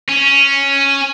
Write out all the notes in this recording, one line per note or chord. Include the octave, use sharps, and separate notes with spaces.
C#4